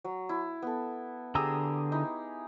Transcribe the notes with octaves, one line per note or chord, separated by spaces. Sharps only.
F#3
E4
B3 A4
D3 G4 G#4 A#5 D#6 E6
D#4 E4